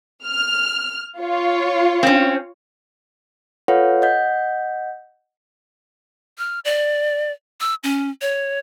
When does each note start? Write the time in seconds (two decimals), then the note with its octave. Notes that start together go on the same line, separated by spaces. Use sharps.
0.25 F6
1.19 F4 C#5
2.03 C4 C#4
3.68 F4 A4 B4 C#5 F5 F#5
4.02 D#5 F#5 G6 B6
6.38 F6
6.65 D5
7.61 E6
7.84 C#4
8.22 C#5